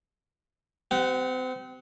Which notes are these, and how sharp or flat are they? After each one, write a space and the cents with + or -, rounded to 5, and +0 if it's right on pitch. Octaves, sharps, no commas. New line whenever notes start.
C4 -35 G4 -30 F#5 +0